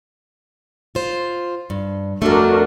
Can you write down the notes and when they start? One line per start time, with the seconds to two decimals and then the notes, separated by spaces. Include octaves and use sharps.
0.95 F4 C5
1.70 G2
2.22 F2 A3 D4 F#4 A#4